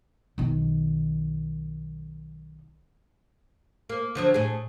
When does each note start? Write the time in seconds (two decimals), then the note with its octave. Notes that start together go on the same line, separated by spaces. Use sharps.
0.38 B1 D#3
3.89 A#3
4.15 D3 F3 F#3
4.34 A2 G#4